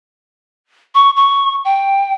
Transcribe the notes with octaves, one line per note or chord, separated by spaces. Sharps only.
C#6
C#6
G5